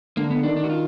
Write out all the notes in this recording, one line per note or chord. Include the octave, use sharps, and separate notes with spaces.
D3 A#3
B3
D3
D#3 D4
D4
F#4
F4